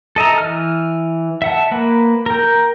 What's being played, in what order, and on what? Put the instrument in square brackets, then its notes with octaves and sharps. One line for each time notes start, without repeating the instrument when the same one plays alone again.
[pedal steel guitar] A4 D#5 E5 A#5
E3 F6
E5 F#5 A5
A#3 B4
A#4 G5